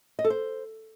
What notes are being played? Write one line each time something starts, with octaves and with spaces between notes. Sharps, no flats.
D#5
A4
C5